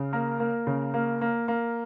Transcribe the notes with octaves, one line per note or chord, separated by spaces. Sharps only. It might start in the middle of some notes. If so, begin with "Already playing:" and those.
Already playing: C#3
A#3 A#4
A#3
C#3
A#3
A#3
A#3